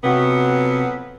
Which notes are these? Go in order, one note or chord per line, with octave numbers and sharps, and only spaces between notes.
F2 C3 F#3 B3 F#4